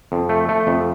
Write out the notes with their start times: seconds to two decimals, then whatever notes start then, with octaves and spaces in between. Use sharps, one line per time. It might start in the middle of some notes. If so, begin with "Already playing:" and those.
0.12 F2
0.29 A3
0.49 A3
0.67 F2